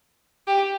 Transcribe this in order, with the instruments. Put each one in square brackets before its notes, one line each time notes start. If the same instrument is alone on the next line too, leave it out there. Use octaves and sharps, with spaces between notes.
[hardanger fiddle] G4